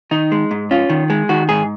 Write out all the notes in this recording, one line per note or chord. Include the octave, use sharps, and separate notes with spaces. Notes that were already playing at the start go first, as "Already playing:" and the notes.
D#3 D#4
G#3
G#2
C#4 F4
D#3
G#3
D#3 F#4
G#2 G#4